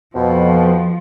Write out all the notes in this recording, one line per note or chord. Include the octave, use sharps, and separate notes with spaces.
F2 B2 F3